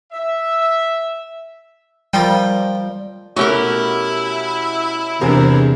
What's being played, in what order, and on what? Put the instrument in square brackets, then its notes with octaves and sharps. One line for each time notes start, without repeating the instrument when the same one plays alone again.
[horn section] E5
[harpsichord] F3 A#4 G5 [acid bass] G3
[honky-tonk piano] B2 A3 C#4 [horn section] E4 [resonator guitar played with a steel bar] F#4 G4 A#4
[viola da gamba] E2 C3 D4 [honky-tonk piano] G#4 A#4 C5